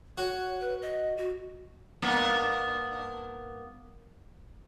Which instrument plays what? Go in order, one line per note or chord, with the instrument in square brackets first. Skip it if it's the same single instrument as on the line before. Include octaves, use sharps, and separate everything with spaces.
[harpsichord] F#4 [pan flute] C#5
[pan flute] B4
D#5
F#4
[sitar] G2 A#3 B3